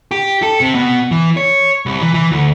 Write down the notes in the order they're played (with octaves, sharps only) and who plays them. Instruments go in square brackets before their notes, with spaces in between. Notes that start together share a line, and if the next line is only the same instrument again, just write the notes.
[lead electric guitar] G4
A4
C3
B2
E3
C#5
C2
E3
E3
D2